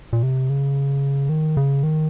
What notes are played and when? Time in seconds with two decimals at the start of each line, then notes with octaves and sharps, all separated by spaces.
0.13 A#2
0.23 C3
0.50 C#3
1.29 D#3
1.57 C#3
1.83 D#3